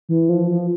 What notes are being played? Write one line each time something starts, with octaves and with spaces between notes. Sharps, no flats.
E3
F3
F3